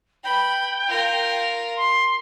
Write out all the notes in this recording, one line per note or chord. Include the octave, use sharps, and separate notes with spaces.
B4 G5 B5
F4 A#4
C6